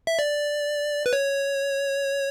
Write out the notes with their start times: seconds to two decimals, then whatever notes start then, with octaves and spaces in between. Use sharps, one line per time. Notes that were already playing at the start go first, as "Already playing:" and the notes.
0.07 E5
0.19 D5
1.06 B4
1.13 C#5